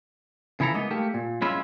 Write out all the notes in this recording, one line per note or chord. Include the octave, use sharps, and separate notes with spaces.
C#3 E3 E4 A4 A#5
G#3 A#3 B3 D#4
A3 A#3 G4
A#2
F#2 G#3 C#4 E4 F4 B5